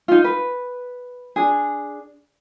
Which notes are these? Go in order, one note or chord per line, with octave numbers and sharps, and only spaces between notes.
D#4 F4
B4
D4 G#4